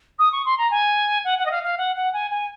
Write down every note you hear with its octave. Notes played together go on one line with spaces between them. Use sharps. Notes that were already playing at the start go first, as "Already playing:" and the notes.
D#6
C#6
C6
A#5
G#5
F#5
F#5
D#5
F5
F5
F#5
F#5
G#5
G#5